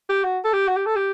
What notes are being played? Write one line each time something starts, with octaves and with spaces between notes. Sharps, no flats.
G4
F#4
A4
G4
F#4
G4
A4
G4